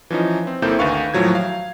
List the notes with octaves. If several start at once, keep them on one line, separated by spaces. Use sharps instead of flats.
E3 F3 C#4 D#4
C4
G1 A#3 C4 E4 A4 G6
D2 D#3 B4 F5 C#6
D#2 A2 F3 F#3 G#6
F5